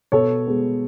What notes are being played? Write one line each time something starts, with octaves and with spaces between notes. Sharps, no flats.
B2 A4 C#5
G#3 B3